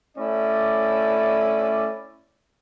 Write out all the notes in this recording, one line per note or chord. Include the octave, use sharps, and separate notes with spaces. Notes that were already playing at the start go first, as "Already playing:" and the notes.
A3 C#4 E4 D5